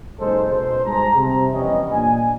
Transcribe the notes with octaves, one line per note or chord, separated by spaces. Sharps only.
F#1 A#2 G#3 D#4 A4 C5
B2 C5
G#2 G3 G#4 A5 A#5
C3
E3 F3 G3 B3 C#4 D#5
A#2 D4 G#5